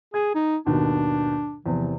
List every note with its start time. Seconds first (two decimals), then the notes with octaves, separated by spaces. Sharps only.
0.14 G#4 G#6
0.35 D#4
0.66 D#2 G#2 B2 D4
1.66 E2 C3 F3